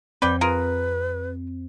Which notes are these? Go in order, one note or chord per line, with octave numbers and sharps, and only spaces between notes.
F2 C4 B4 D5 G5
F4 G#4 A#4 B4